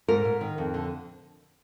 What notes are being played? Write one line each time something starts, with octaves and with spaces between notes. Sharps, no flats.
G#2 A#4
G#2
D#3
F2
D3